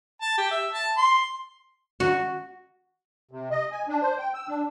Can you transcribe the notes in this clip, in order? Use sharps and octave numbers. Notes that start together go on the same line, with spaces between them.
A5
G4
E5
A5
C6
F#4
C3
D#5
G#5
D4
C5
G5
E6
D4